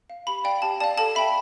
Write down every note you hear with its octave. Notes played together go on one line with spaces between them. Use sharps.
F5
G4 B5
D5 F5 G5
G4 A5
D5 F5 A5
A4 A5
E5 G5 B5